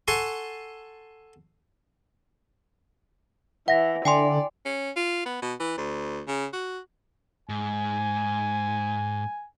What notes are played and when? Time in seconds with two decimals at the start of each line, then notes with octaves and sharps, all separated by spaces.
0.08 A4 F#5 G#5 C6 C#6
3.68 E3 E5 F#5 A#6
4.05 D3 D5 G5 G#5 C6
4.65 C#4
4.96 F4
5.25 B3
5.42 B2
5.60 E3
5.77 D2
6.28 C#3
6.53 F#4
7.49 G#2 G#5